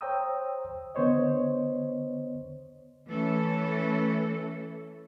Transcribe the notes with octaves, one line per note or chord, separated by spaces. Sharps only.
C5 C#5 G5 A#5 D#6 E6
D3 B3 C5 C#5 D#5
E3 A3 C#4 A4